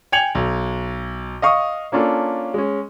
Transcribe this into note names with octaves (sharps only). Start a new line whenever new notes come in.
G5 G#5 G#6 C#7 F7 F#7
B1
D#5 F5 C#6 D#6
A#3 C#4 D4 F4 A4
G#3 C#4